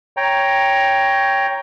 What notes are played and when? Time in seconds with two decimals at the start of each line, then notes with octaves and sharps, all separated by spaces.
0.17 C#5 G5 A#5